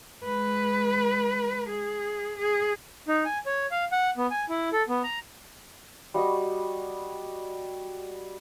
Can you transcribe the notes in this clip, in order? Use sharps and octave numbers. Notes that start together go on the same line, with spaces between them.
G#3 B4
G#4
G#4
D#4
G#5
C#5
F5
F#5
B3
G#5
E4
A4
B3
A#5
G3 F#4 D#5 C#6